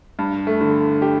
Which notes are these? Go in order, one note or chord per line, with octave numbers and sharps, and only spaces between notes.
G2
A3
D3
G4